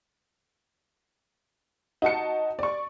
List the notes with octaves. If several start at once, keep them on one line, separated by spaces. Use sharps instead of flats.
D#4 F#4 A5 C#7
D5 C#6